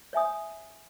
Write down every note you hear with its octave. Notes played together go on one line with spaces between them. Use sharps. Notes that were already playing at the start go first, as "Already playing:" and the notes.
C#5 E5 G#5 D#6